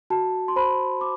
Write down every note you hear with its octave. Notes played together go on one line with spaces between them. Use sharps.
F#4 A5
C6
C5 B5
D6